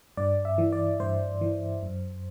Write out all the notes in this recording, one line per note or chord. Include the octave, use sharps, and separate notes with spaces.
G2 D5
E5
E3
D5
G2 C5
E3
F#2